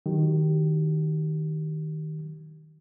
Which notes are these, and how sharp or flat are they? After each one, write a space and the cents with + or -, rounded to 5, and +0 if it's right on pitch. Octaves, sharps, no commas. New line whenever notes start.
D#3 +0 F#3 +0 G4 -15